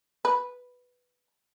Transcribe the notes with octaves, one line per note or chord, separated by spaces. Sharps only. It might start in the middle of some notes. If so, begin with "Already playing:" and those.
B4